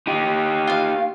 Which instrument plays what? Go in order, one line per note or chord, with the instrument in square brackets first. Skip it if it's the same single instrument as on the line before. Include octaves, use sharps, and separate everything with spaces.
[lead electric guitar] D#4 G4
[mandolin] F4 F5